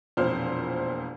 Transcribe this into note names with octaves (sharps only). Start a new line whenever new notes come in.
E1 F2 A#2 C5 F6